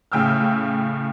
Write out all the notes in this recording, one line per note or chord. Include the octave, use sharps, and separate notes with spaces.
A2 C#3 G5 E6 F6